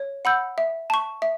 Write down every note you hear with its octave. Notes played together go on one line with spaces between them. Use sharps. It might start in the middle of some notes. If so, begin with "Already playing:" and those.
Already playing: C#5
F#5 B5 E6 G6
E5
A5 C#6
E5